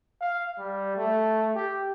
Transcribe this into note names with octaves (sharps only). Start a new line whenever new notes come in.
F5
G3
A3
G4